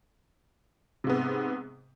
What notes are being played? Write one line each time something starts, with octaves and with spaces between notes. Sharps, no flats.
G#2 C3 B3